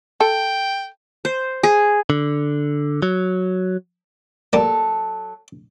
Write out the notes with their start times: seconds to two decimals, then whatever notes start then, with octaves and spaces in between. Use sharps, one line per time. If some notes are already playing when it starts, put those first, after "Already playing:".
0.21 A4 G5
1.25 C5
1.63 G#4
2.10 D3
3.02 F#3
4.53 F#3 G3 A#3 A4